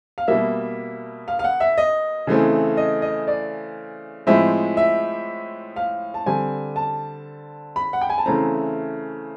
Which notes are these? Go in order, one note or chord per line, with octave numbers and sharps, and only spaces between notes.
F5
B2 G3 A#3 E5
F5
F5
F#5
E5
D#5
C#3 E3 A3 C4
D#5
D#5
D5
A2 F3 G#3 C4 E5
E5
F5
A5
D3 G3 C4 G#5
A5
B5
F#5
G5
G#5
A5
C#3 E3 A3 C4 A#5